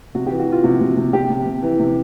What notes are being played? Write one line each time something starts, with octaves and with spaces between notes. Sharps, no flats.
C3 F#4
E3 G4
F#4
E3 F4
C3 F#4
C3
C3
C3 G4
C3
C3
E3
C3